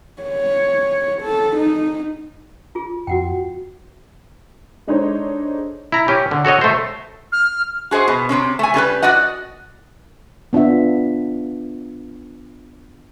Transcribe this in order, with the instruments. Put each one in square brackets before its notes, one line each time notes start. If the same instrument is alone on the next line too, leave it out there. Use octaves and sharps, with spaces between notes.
[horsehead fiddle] C#5
A4
D#4
[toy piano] F4 G#4
[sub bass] F2 [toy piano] F#4 F#5 G5
[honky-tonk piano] G#3 D4 D#4 A4 C5 C#5
[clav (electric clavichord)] E4 A#5
C#4 G4
D3
F#4 A4 C#5 D#5
A3 C5
[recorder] F6
[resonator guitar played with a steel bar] F#4 G#4 C5 D#5
B2
C3 G#3 C4 C#4
A3 G#5
G3 C#4 A#4 B4
F#4 D5 D#5 F#5
[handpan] B3 D4 F4 E5